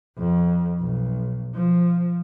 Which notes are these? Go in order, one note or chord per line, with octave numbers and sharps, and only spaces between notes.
F2
B1
F3